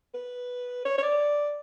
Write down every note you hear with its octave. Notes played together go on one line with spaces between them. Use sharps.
B4
C#5
C#5
D5